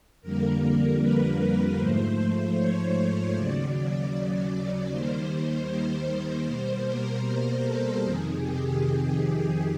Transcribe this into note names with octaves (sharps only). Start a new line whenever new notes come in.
F2 D3 G3 A#3 A#4
B4
G#2 F3 A3 C5
C#5
D#2 C#3 F#3 D5
D5
D#2 D#3 G3 A#3 C5
C5
B2 G3 A#3
A#4
A4
F2 C3 D#3 G#4
G4